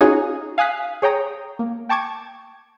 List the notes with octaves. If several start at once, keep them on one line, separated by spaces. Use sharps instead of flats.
C#4 D#4 F4 F#4 G#4 C#5
F5 G#5 D#6 F#6 B6
G#4 C#5 G5 A#5 D#6
A#3
G5 A5 C#6 D6 G#6